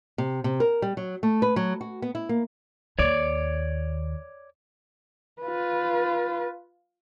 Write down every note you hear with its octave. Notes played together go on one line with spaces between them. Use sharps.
C3
C3
A#4
G3
F#3
A3
B4
F#3
F#4
B3
E4
A#3
D#2 C#5 D5
F4 B4